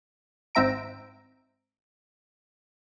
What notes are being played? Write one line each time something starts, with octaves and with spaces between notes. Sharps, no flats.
G#1 G#2 C4 E5 A#5 D7